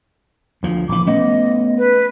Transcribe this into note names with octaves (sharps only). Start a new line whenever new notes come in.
D2 F3
A#1 E3 D6
A3 B3 C#4 D#5
B4